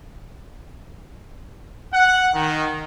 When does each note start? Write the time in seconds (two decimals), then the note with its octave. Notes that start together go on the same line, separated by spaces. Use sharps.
1.93 F#5
2.34 D#3